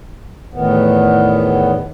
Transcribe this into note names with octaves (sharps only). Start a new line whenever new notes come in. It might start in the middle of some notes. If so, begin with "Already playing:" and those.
E2 A2 D#3 B3